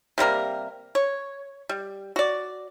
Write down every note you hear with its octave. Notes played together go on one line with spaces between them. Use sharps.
C3 G3 A#3 A#4
C#5
G3
F#4 D5